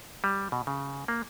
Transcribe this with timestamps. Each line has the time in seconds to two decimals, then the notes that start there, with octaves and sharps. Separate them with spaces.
0.24 G3
0.52 B2
0.67 C#3
1.08 A#3